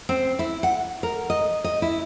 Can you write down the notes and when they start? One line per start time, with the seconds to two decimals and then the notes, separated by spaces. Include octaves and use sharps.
0.09 C4
0.39 E4
0.63 F#5
1.03 A#4
1.30 D#5
1.64 D#5
1.82 E4